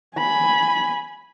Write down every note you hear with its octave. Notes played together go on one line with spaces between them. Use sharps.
G#5 B5